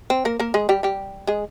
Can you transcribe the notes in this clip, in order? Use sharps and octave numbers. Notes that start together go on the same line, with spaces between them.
C4
A#3 A#4
A#3 A#4
G#3 G#4
G3 G4
G3 G4
G#3 G#4